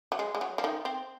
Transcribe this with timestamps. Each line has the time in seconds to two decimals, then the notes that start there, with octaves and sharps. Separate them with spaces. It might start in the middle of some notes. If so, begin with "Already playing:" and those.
0.12 F#3
0.19 G#3
0.35 G#3
0.41 F#3
0.58 F3
0.64 D#3
0.85 C4